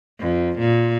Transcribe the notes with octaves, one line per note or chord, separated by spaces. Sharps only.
F2
A#2